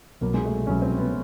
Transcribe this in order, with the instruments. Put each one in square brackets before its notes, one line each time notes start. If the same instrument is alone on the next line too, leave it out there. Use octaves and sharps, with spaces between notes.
[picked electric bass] C2 B2 F#3 [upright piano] A#3
[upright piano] G#3
A3
[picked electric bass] C2 B2 F#3 [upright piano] C#4
[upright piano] C4
B3